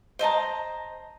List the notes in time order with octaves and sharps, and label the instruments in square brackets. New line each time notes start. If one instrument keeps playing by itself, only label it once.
[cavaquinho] C5 D#5 A5 A#5